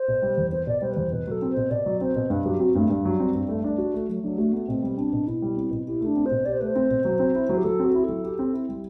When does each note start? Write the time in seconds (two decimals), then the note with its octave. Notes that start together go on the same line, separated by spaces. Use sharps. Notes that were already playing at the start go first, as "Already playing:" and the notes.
Already playing: C5
0.08 B2
0.22 G3
0.37 E2
0.52 B3 C5
0.67 B2 D5
0.82 G3 C5
0.91 B4
0.97 E2 C5
1.11 B2 B4
1.27 F#3 A4
1.42 C4
1.51 C5
1.57 B2
1.71 B2 D5
1.86 F#3
2.01 C4 C5
2.16 B2
2.30 G2 B4
2.45 F#3 G4
2.60 C4 F#4
2.75 G2 A3
2.90 G2 G3
3.05 F#3
3.20 C4
3.35 G2
3.49 A3
3.64 D4
3.78 F#4
3.94 A3
4.08 F#3 A3
4.23 F#3 D4
4.38 A3 F#4
4.53 A3 B3
4.68 B2 C4
4.83 G3
4.97 C4 D4
5.13 B2
5.27 B2 E4
5.42 G3
5.56 C4
5.71 B2
5.87 E4 G4
6.01 A3
6.06 D4
6.16 C4
6.26 C5
6.31 B2
6.45 G4 D5
6.53 C5
6.60 A3 B4
6.68 C5
6.75 C4
6.90 B2
7.05 F#3
7.19 C4
7.35 E4
7.49 F#3
7.58 G4
7.64 F#3 A4
7.79 C4
7.85 F#4
7.95 E4
8.04 F#3 A4
8.24 G4
8.39 C4
8.53 E4
8.69 G3